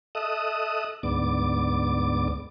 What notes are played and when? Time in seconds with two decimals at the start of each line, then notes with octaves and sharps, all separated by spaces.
0.15 A4 D#5 E5 D#6 F#6
1.03 D2 G#2 B3 D5 D6